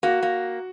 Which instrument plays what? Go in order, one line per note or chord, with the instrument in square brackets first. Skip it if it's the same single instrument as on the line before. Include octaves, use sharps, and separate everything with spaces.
[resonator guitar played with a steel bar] A#3 [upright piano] F#4
[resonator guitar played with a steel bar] A#3